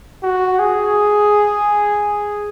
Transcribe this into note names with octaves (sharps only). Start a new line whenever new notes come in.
F#4
G#4